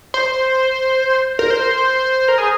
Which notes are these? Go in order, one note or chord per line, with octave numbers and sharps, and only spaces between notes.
C5
A#4
C5
A#4
G#4